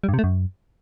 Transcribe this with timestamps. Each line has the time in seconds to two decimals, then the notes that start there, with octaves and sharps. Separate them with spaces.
0.04 G3
0.09 G2
0.14 C3
0.19 A3
0.24 F#2